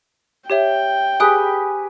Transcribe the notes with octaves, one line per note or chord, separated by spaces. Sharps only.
G4 C#5 E5 G5
G4 G#4 B4 D#6 F#6 D7